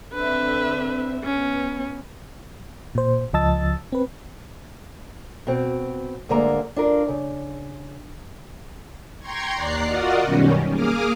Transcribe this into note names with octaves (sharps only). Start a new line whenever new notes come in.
D3 C4 B4 E5
B3 C#4
A#2 C5
C#2 F3 D#5 A5 E6 A6
C4 B4
B2 C4
D2 G#2 D3 G#3 A#3 A#5
D4 F4 A#4
C#3
G5 A#5 C6 C#6 G#6
D#2 D5 A#5 F#6 C7
F4 F#4 A#4 D5 D#5 F#5
F#2 B2 D#3 G3 C#4
A#3 G#4 D6 D#6 F6